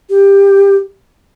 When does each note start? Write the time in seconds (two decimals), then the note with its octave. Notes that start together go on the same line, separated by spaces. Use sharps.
0.10 G4